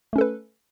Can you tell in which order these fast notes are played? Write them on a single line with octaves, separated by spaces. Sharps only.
A3 C#4 A4 B4